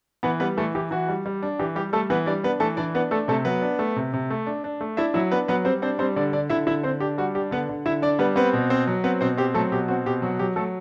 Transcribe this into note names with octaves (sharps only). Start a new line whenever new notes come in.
E3 B3 B4
G3 B3 B4
E3 A3 A4
E3 G4
E3 F#4
G3
G3
D4
E3 G4
G3 G4
G3 A3 A4
E3 B3 B4
G3 D4 D5
B3 D4 B4
E3 A3 A4
E3 D4 D5
B3 D4 B4
A3 D4 A4
C3 A3 A4
F#3 B3 B4
D4
A3
C3
C3
A3
D4
D4
A3
D4 E4 E5
F#3 E4 E5
B3 D4 B4
F#3 B3 B4
G3 C4 C5
C4 D4 C5
G3 C4 C5
D3 D4 D5
D3 D4 D5
D3 E4 E5
D3 E4 E5
D3 C4 C5
D4 G4
G3 F#4
D4 G4
D3 B3 B4
D3
D3 E4 E5
D4 D5
G3 B3 B4
B3 C4 B4
B2
C4 C5
F#3
B3 C4 B4
B2 C4 C5
C4 G4
F#3 A3 A4
B2 G4
C4 F#4
B2 G4
F#3 F#4
F#3 G4
F#3 A3 A4